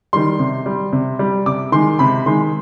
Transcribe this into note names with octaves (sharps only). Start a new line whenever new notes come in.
D#3 G3 C6
C3
G3
C3
G3
C3 D6
D#3 G#3 C6
C3 B5
D#3 G#3 C6